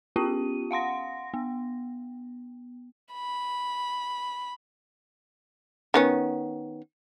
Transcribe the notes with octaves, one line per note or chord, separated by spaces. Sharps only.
B3 C#4 F4 G4 D#7
F5 F#5 C6 A#6
B3
B5
D#3 B3 C#4